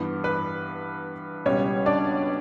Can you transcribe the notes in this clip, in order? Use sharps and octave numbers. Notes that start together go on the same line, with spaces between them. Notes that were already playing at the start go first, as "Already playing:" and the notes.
Already playing: G2 E3 B3
B4
C#2 B2 G3 C#4 C#5
D4 D5